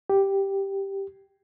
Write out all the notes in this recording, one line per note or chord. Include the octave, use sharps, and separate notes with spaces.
G4